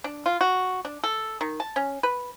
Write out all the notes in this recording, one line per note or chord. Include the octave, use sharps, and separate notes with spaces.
D4
F4
F#4
D4
A4
D#3
A5
C#4
B4